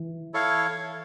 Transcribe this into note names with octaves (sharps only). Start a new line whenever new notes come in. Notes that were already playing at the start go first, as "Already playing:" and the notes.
Already playing: E3
E4 A4 C#5 F5